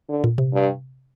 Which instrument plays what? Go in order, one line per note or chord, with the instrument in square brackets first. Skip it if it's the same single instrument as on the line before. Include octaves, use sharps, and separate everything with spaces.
[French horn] D3
[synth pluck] A#2
C3
[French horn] G2